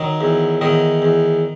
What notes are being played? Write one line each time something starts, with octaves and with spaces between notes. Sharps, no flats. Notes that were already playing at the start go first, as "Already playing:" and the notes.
Already playing: D#3 F#3 D#4
E2
E2 D#3 D#4
E2